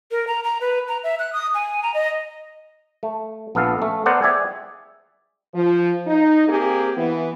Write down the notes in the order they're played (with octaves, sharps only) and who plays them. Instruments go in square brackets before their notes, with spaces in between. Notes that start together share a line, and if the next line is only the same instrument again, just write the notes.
[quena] A#4
A#5
A#5
B4
A#5
E5
F#6
D#6
G#5
A#5
D#5
[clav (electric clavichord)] A3
A#1 B3 A4 F5
A3 C#4
B3 A4 A#4 C5 D5 F#5
G#4 D5 E5 G5 G#5
[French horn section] F3
D#4
A#3 C4 G4 G#4
E3 B3